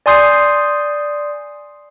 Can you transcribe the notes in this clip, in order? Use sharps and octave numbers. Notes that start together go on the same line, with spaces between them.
D5 G#5 C6 D#6 G6 C7